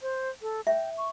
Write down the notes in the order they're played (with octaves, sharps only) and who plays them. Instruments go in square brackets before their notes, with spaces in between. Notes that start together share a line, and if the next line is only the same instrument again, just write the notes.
[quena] C5
A4
[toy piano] E5 [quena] G5
[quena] C#6